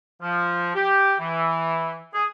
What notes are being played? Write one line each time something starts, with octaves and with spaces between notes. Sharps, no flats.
F3
G4
E3
G#4